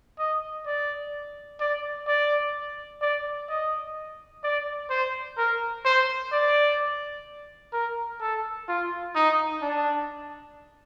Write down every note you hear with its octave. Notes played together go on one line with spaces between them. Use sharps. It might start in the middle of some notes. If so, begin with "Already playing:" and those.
D#5
D5
D5
D5
D5
D#5
D5
C5
A#4
C5
D5
A#4
A4
F4
D#4
D4